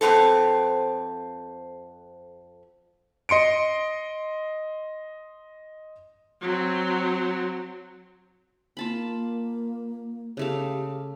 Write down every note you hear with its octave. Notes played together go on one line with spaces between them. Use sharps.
F2 D#3 B3 C4 A4
D#5 C6 C#7 D7
F#3 C4
A#3 F4 A5 B5
C#3 A3 G4 F5